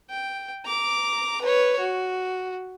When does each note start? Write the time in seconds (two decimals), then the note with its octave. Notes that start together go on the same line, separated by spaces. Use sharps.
0.10 G5
0.65 A#5 D6
1.42 B4 C#5
1.79 F#4